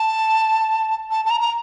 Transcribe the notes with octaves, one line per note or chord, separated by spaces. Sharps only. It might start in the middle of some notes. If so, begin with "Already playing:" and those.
Already playing: A5
A5
A5
A#5
A#5